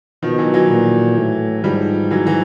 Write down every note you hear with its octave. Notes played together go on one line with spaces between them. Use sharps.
B2 D#3 F3
E3 F#3
E3 F#3
A#2
A2
G#2 F3 G3
E3 F#3
E3 F#3